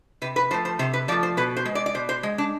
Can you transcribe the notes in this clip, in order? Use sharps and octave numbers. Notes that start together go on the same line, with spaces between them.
C3 B4
B4
F3 A3 C5
C5
C3 C5
B4
F3 A3 D5
C5
B2 B4
C5
G#3
D5
D5
B2 C5
C5
G#3
D4